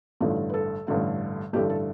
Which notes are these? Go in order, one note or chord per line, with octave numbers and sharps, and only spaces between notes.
A1 G2 D3 A3 F4
B4
A4
A1 G2 D3 A3
A1 G2 D3 A3 G4
A4